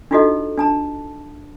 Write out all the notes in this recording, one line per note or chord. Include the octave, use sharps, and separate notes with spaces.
D4 D#4 F4 F#4 A4 D#5
D4 A5 A#5